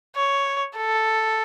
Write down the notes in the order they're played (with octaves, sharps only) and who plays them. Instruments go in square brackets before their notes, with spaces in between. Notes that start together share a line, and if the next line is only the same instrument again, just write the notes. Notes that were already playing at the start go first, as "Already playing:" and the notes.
[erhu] C#5
A4